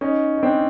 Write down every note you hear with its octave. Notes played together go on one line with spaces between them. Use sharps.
C#4 D#4
D#4
C4 D4